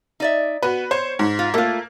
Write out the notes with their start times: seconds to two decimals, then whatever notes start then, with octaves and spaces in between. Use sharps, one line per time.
0.20 D#4 D5 E5
0.62 B3 F#4 B4
0.91 C5 C#5
1.19 G#2
1.39 F4
1.54 A3 A#3 F4